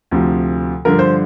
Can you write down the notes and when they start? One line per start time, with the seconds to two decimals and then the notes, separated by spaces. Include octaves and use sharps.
0.11 D2 C3 F3
0.85 G2 D3 F3 A#4
0.99 C5